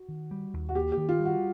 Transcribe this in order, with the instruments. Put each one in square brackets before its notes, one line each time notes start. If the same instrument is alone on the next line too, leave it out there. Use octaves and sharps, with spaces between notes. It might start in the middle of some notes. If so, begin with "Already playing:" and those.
Already playing: [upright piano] F#4
[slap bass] D#3
G3
D#2
[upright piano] F#4
[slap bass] A#3 [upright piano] G4
[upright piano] G4
[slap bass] D#3
[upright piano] F4
[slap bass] G3
[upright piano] F#4